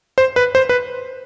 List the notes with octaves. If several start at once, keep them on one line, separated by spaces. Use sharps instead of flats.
C5
B4
C5
B4